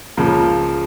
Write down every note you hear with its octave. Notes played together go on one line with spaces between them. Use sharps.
C#2 C#3 F3 A#3